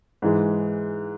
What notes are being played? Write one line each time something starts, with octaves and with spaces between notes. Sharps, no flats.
G#2 E3 G#3